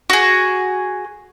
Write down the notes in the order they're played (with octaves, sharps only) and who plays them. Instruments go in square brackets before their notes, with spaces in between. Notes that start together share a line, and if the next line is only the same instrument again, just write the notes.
[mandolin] F#4 G#4